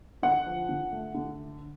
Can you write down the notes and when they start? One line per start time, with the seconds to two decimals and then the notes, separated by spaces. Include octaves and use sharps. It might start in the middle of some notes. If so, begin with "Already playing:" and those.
0.23 D3 F#5
0.46 F3
0.69 D3
0.92 A3
1.15 D3